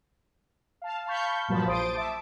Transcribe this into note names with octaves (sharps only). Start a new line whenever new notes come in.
F5 A5
F5 A5 B5 C#6 G6
G2 A#2 F3 F#3 A5 B5
A#1 C5 C6 D#6 A6 D7
E5 A5 D6